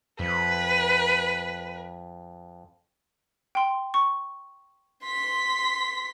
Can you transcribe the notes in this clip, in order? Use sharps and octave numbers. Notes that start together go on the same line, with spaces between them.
F2 B4
G5 C6
C#6
C6 B6